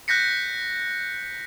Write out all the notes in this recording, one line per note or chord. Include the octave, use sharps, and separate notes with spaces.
F#6 G6 A#6 B6 C#7